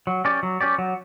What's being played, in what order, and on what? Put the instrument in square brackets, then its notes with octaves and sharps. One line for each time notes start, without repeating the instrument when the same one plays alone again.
[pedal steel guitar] F#3
C#4 G4 D5
F#3
C#4 G4 D5
F#3